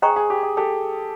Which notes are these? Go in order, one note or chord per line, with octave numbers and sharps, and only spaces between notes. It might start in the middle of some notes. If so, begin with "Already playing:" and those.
G#4 C5 D#5 G5 A#5 C#6
G#4
G4
G#4
G4 A4